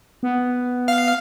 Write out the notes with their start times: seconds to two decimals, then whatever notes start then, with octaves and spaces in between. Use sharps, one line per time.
0.23 B3
0.88 F5